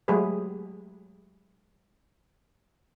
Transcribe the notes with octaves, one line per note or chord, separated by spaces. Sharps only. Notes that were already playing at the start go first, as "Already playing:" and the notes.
F#3 G#3 A3 G4 G#4 B4